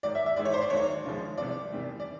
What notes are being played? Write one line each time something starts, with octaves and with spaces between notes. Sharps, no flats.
G#2 D#3 F#3 D5
E5
E5
G#2 E3 G#3 D5
C#5
C5
D5
D#2 D#3 F#3 C#5
D#2 C#3 F3 G#3
C2 C3 F3 D5
E2 C3 D#3 G3
D5